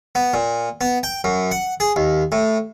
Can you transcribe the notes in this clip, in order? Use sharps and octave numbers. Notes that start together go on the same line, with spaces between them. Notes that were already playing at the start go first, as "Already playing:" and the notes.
B3
A#2
B3
G5
F#2
F#5
G#4
D#2
A2